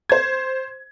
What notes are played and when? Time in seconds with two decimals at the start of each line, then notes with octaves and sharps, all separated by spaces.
0.09 C5 G#6